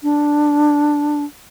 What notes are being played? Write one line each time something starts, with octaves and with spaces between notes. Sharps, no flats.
D4